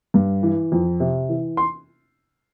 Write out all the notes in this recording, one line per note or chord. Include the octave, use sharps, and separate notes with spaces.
G2
E3
F2
C3
E3
C6